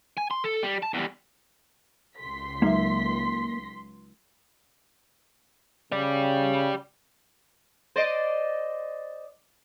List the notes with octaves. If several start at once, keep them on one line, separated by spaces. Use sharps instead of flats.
G#5
C6
A4
G3
A5
E2 G3
C#2 C6 B6
F#3 G#3 A#3 D#4 E5
C#3 G4 D5
C5 D5 D#5